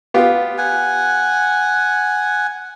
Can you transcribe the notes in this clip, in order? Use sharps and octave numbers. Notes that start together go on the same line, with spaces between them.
B3 F4 G4
F#5 G#5